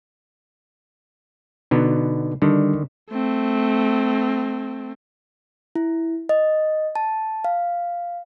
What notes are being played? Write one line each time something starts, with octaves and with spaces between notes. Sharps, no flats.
B2 D3 B3 D#4
D3 D#3 G3 D4
A3 C4
E4
D#5
A5
F5